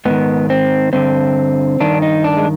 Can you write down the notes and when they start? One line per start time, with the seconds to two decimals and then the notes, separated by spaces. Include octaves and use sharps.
0.05 G#2 D#3 B3
0.50 C4
0.93 G2 D3 C4
1.80 G2 D#3 D4
2.02 D#4
2.24 D4
2.37 G#3